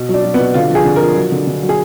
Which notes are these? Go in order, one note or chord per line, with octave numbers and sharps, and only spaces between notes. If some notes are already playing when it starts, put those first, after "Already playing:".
Already playing: B2
F#3 D4
F#3
B3
B2
D3 F4
F3 G#4
D3
F3 A#4
F#3
D3
D3
F#3
G#4